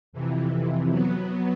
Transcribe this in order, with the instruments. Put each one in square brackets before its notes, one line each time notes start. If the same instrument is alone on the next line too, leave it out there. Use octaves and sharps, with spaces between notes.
[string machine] F2 C3 E3
F#3 B3